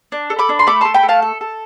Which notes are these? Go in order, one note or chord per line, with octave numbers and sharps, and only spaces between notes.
D4
A4
B5 D6
D4
C6
A3 B5 D6
A3 A5 C6
G5 B5
A3
F5 A5
A4
A4